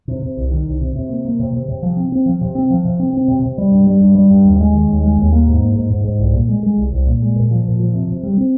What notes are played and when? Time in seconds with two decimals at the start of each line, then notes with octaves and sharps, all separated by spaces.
0.08 C3
0.22 C3
0.37 C2
0.51 D#3
0.66 C2
0.81 C3
0.95 C3
1.09 A#3
1.25 A#3
1.39 C3
1.53 C3
1.68 C3
1.82 F3
1.97 C4
2.12 C4
2.26 F3
2.41 C3
2.55 C4
2.70 F3
2.85 C3
3.00 C4
3.14 C4
3.28 C3
3.42 C3
3.58 G3
3.71 G2
3.87 G3
4.01 G2
4.15 G3
4.30 G2
4.44 D#2
4.60 G#3
4.74 D#3
4.88 D#2
5.03 G#3
5.18 D#2
5.32 A#3
5.47 G#2
5.61 A#3
5.75 G#2
5.90 G#2
6.04 G#2
6.19 C2
6.33 A#2
6.48 G#3
6.63 G#3
6.78 C2
6.92 C2
7.07 A#2
7.22 G#3
7.36 A#2
7.51 F3
7.65 A#2
7.79 F3
7.94 C3
8.08 C3
8.23 G3
8.37 C4